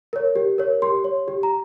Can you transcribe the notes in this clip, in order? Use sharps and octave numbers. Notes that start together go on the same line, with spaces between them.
A#4 C#5
G4
A#4 C#5
G4 C6
C#5
G4
A#5